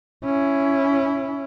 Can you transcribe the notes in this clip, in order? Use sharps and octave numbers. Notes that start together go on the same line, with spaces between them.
C#4 E4